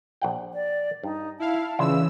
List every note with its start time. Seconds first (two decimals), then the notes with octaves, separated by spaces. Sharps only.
0.22 A#1 F#5 G5
0.54 D5
1.03 G2 D#4
1.40 E4 F5 A5
1.79 C#3 E3 D4 E4 F4 E6